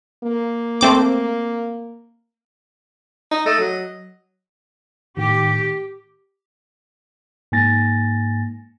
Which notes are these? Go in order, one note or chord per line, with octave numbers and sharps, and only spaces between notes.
A#3
A3 C4 D6
D#4
A3 D#5
F#3
A2 D#3 G4
G#2 A#3 G#5 A6 A#6